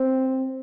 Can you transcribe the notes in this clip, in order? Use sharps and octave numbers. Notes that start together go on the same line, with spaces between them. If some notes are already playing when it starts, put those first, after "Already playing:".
Already playing: C4